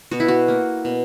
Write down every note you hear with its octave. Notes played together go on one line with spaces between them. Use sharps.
B2 F#4
E4
F#4
A#3
B2